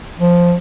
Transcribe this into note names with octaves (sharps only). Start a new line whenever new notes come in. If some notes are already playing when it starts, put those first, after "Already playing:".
F3